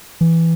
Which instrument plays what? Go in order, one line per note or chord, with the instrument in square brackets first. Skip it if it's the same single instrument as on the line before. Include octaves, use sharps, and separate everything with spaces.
[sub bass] E3